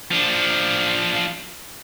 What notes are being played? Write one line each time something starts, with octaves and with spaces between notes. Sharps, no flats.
F3 D4